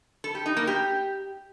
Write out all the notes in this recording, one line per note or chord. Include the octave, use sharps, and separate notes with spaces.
A4
G4
D#4
A#3
G4